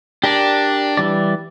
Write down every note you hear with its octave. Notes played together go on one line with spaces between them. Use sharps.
D4 G4 A#4 D5
E3 G3 D5